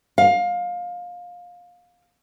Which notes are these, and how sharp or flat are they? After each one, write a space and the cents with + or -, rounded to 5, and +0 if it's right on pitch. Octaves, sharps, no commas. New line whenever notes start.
F5 +20